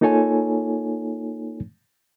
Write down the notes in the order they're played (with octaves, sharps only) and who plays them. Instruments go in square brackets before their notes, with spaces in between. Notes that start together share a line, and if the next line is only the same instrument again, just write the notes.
[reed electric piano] A#3 D#4 F4 A4 C#5 G#5